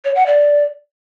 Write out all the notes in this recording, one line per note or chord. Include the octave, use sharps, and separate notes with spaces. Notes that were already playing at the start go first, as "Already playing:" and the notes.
C#5
F#5
D5